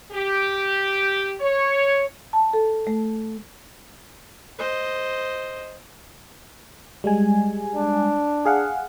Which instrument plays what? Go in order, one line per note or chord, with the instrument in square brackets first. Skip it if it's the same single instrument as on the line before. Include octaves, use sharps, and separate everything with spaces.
[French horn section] G4
C#5
[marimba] A5
A4
A3
[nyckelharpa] C5 D#5
[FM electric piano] G3 G#3 G#5
[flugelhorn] D4
[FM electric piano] G#4 F5 F#5